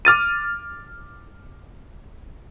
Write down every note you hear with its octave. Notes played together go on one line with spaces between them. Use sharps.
D6 F6 A6 D#7